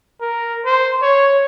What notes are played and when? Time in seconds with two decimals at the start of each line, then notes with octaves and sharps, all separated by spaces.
0.21 A#4
0.66 C5
1.03 C#5